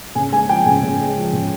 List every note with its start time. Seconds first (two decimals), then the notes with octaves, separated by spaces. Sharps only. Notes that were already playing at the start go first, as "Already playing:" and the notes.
0.15 C#3 G#5
0.32 G#3 G#5
0.49 F3 G5
0.66 C#3 G#5
0.83 C#3
1.00 G#3
1.17 F3
1.33 C#3